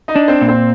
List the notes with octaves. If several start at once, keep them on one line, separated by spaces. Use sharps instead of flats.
D#4 D#5
D4
C4 C5
A#2
C4 C5